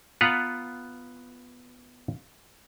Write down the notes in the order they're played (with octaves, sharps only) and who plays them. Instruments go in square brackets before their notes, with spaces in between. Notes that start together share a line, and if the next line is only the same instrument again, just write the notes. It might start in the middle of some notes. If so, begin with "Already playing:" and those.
[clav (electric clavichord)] B3 F4 B4 F#5 A#5